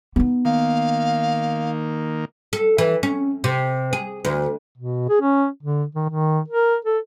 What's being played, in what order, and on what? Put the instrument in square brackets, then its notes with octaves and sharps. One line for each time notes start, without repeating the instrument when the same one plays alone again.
[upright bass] B3 D#4
[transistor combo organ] D#3 A#3 [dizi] F5
[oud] A4
E3
C#4
C3
G#4
D2
[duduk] B2
G#4
C#4
D3
D#3
D#3
A#4
A4